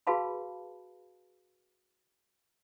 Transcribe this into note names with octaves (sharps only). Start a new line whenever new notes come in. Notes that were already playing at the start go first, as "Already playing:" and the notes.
F#4 G#4 B4 F5 A5 B5